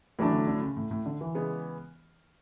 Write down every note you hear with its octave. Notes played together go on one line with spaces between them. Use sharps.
A2 E3 F#3 A3 D4
D3
D3
C#3
A2
A2
D3
E3
C#3 G#3 B3